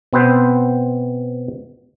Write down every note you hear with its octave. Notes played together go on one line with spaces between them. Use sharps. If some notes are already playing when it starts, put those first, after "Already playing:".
B2 B3 C4 B4 C5